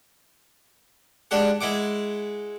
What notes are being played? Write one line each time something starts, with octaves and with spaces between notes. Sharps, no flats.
G#3 D4 G4 F#5
G#3 E4 F#5 D6